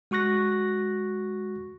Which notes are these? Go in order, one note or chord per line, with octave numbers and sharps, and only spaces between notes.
G#3 F#4 C#6 F#6 A#6